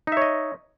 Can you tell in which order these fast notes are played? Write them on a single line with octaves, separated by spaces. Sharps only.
D#4 E5 C#5 D#5